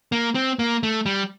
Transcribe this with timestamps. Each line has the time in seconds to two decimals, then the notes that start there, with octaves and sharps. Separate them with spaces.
0.12 A#3
0.35 C4
0.59 A#3
0.83 A3
1.06 G3